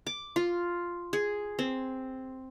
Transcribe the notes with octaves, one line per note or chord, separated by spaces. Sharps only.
D6
F4
G#4
C4